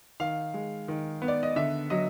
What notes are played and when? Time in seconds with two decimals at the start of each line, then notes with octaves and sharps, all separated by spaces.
0.20 D#3 F5
0.54 G#3
0.88 D#3
1.22 B3
1.28 D5
1.43 D#5
1.56 D3 E5
1.90 F#3 D#5